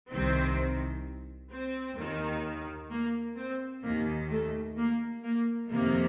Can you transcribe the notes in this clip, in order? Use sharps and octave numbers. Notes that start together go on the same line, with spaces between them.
C2 C3 D#3 C4
C4
D#2 D#3
A#3
C4
D#2 D#3 A#3
A3
A#3
A#3
F2 C3 D#3 A#3